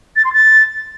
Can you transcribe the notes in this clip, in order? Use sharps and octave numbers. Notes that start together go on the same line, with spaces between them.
A6
C6
A6